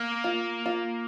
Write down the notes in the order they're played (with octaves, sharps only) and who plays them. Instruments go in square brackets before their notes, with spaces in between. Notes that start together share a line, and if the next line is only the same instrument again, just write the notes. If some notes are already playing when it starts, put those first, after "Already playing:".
Already playing: [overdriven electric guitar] A#3
[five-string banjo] F4
F4